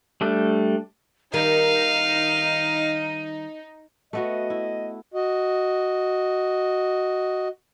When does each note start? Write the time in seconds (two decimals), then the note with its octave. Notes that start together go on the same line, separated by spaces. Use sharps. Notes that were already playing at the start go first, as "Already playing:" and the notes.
0.21 G3 A3 D4
1.34 D#3 G3 D#4 A#4 F5 D#7
4.13 A3 B3 F#4 D#5
4.50 E4
5.14 F#4 D#5